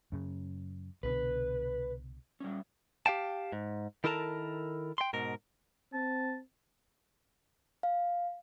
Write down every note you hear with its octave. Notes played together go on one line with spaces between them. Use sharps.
F#2 C#3
C2 B2 D3 B4
G3 C#4
G4 F5 G5 A5
G#2
D#3 E4 A4 A#4 A5 A#5
G5 C6
G#2 B2 A#4
C4 A5
F5